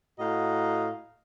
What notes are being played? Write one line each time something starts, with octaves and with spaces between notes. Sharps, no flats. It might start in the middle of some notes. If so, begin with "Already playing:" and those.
A2 F#4 D#5 F5 F#5 A#5